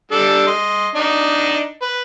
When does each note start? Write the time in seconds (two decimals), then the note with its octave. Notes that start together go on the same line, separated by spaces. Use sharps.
0.12 G3 D4 A4
0.47 D#5 C6
0.95 D4 D#4
1.82 B4